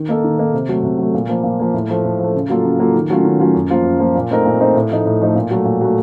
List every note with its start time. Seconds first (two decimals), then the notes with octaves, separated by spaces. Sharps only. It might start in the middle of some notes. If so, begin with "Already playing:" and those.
Already playing: D#3
0.09 A#3 D#4 A4
0.24 D#3
0.39 A#3 D#4 A4
0.54 C3
0.69 F#3 A3
0.83 C3
0.99 F#3 A3
1.14 A#2
1.29 F3 A#3
1.44 A#2
1.59 F3 A#3
1.74 A2
1.89 F3 A3
2.04 A2
2.19 F3 A3
2.34 C#3
2.50 F#3 A#3 F4 A4
2.64 C#3
2.79 F#3 A#3 F4 A4
2.94 D#3
3.10 F#3 A3 C#4 F4
3.25 D#3
3.40 F#3 A3 C#4 F4
3.54 F#2
3.70 F3 A#3 F4
3.85 F#2
4.00 F3 A#3 F4
4.15 A#2
4.31 A3 C4 D#4 A#4
4.45 A#2
4.60 A3 C4 D#4 A#4
4.75 A2
4.91 F3 A3 D#4
5.05 A2
5.21 F3 A3 D#4
5.35 A#2
5.51 F#3 A3
5.65 A#2
5.81 F#3 A3